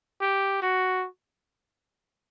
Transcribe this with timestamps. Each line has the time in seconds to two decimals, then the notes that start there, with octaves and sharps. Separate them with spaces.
0.21 G4
0.62 F#4